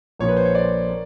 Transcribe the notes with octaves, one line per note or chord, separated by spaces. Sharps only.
A#1 A#2 F3 C#5
B4
C5
C#5
D5
A#3